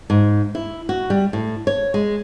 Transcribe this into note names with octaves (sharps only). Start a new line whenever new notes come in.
G#2
E4
F#4
G3
A2
C#5
G#3